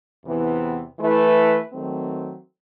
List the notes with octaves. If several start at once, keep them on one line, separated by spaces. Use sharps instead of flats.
E2 C3 E3 B3
E3 A3 E4 B4
D#3 F#3 A3 C4